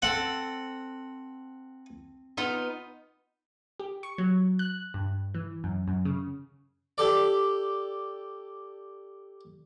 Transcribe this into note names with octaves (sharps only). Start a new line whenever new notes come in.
C4 A4 F#5
B3 D#4 F4
G4
C#6
F#3
F#6
G2
E3
F#2
F#2
C#3
G4 A4 D5